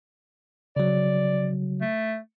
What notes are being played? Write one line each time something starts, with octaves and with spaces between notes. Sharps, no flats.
C#3 F#3 D5
A3